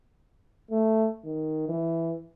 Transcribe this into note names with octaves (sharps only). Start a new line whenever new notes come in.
A3
D#3
E3